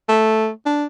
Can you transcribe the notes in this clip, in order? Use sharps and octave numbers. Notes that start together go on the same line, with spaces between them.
A3
D4